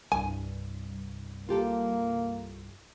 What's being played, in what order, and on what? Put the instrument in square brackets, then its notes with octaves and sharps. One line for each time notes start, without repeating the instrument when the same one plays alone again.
[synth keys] C2 G2 [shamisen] G#5
[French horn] A#3 [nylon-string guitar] F4 G4 A4